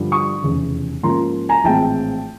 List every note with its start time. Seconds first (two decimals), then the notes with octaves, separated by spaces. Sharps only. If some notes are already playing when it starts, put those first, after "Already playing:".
Already playing: G2 D3 F3
0.12 C#6 D#6
0.42 F1 E2 C#3
1.03 G#2 F3 A#3 C#4 A#5 C6
1.49 G#5 A#5
1.64 A#1 A2 E3 G#3 C4 G5 A5